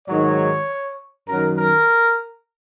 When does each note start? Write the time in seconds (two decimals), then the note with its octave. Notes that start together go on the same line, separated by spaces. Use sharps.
0.08 G#2 D#3 F#3 C#5
1.28 F#2 D#3 F#3 A#4
1.58 A#4